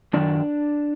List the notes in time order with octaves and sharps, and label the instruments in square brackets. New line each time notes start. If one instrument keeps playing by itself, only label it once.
[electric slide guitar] F#2 D#3 F#3 D4 D5